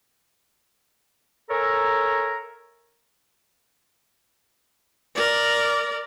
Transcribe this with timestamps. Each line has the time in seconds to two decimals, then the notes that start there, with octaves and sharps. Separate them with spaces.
1.49 A4 A#4 C#5 E5 G#5 A#5
5.15 A#4 D5